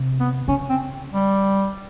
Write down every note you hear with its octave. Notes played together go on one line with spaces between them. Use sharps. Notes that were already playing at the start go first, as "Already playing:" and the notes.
Already playing: C3
B3
C#3 C#4
C4
G3